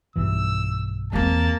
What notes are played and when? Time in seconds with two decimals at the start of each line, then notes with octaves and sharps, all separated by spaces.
0.16 B1 G2 E3 E6
1.13 E2 A#3 C4 A5